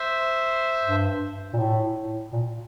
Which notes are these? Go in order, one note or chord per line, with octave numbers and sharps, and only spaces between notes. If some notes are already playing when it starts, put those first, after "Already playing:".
Already playing: C5 E5
G2
A#2
A2
A#2